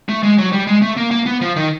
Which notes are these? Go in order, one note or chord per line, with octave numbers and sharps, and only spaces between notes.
A3
G#3
F#3
G3
G#3
A3
A#3
A#3
B3
F3
D#3